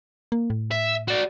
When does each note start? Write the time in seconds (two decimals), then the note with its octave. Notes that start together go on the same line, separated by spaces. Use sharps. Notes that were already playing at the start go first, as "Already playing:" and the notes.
0.32 A#3
0.50 A2
0.71 E5
1.08 F#4 D5